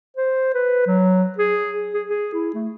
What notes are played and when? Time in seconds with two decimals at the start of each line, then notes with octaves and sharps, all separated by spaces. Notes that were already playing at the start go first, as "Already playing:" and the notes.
0.17 C5
0.54 B4
0.87 F#3
1.38 G#4
1.94 G#4
2.09 G#4
2.34 E4
2.54 A3